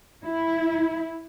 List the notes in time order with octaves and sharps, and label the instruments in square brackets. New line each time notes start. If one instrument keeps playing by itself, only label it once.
[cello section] E4